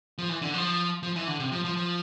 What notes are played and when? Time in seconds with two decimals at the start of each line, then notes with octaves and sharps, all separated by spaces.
0.18 F3
0.29 E3
0.42 D3
0.54 F3
1.03 F3
1.16 E3
1.27 D3
1.39 C3
1.52 F3
1.65 F3
1.77 F3